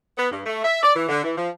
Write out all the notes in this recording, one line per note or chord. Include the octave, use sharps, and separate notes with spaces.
B3
G2
A3
E5
D5
E3
D3
E3
F3